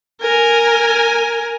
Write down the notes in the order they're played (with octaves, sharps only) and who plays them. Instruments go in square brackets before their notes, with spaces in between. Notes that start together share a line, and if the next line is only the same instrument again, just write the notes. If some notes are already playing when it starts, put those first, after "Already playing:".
[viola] A#4 G#5